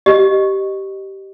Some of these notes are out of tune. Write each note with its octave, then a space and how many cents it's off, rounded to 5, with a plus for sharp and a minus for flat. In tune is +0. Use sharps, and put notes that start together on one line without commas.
G4 -15 D#5 -20